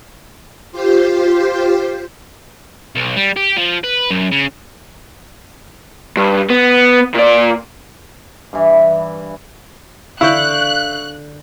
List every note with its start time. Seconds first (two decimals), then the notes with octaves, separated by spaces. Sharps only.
0.72 F4 G4 C5
2.96 B1
3.16 G3
3.36 G4
3.57 F3
3.84 B4
4.11 F#2
4.32 C#3
6.17 G2
6.50 B3
7.15 A#2 D5
8.53 G2 E3
10.21 D3 E4 F5 C#6 F#6 G6